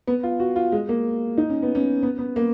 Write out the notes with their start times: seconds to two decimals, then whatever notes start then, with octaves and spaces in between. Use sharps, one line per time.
0.07 B3
0.23 F4
0.40 F#4
0.56 F4
0.72 G#3
0.89 A#3
1.38 D#4
1.49 C#4
1.62 B3
1.75 C#4
2.03 B3
2.19 B3
2.36 A#3